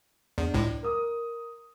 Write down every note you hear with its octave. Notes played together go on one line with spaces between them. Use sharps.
E2 D4
C#2 A2
A#4 D#6